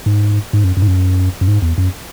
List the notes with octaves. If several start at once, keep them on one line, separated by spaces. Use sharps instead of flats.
G#2
G#2
F#2
F#2
G#2
F#2
F#2
G#2
E2
F#2